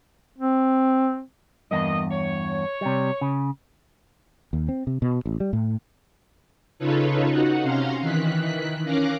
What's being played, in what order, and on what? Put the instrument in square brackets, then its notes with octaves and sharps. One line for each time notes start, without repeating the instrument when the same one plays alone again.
[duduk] C4
[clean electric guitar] E2 G2 [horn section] B2 A#3 D#5
[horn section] C#5
[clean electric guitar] C3 G3
C#3
[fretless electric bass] D#2
C4
C3
B2
A1
G3
A2
[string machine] C#3 D#4 F4 A4 B4 C#5
D#4 F#4 F#5
C3 C#4 F5 A#5 C6
D#3 E3 F#6 B6
C#4 A#4 F5 A#5 D6 F#6